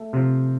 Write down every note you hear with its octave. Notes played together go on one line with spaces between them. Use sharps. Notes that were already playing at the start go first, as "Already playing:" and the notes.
Already playing: A3
C3 F3